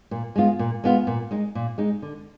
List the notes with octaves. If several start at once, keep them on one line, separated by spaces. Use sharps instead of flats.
A#2
G#3 B3 F4
A#2
G#3 B3 F4
A#2
G#3 D#4
A#2
G#3 D#4
D3